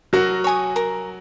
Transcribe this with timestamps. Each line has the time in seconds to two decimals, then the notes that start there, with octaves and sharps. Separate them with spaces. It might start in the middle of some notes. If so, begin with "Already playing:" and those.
0.13 F#3 F#4 A#4
0.44 C#5 G#5 D#6
0.76 A#4